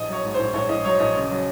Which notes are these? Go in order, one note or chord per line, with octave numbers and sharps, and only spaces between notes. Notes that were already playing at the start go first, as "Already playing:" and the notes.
Already playing: A#1 D#5
F#3 C#5
G#2
C5
A#1
A#1 C#5
A#1 D#5
F#3 C#5
A#1 D#5
C#3
F#3